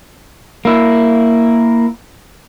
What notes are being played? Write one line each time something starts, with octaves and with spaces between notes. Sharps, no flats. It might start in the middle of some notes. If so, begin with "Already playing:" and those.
A#3 E4